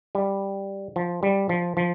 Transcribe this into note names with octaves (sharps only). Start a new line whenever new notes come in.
G3
F3
G3
F3
F3